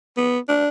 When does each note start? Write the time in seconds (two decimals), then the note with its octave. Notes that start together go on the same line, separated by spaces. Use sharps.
0.17 B3
0.49 D4